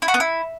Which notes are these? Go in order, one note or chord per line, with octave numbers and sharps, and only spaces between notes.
E4
F#4
B3
E4